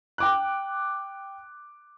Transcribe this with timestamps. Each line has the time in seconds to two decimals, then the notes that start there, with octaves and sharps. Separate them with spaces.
0.18 G5 D6 F#6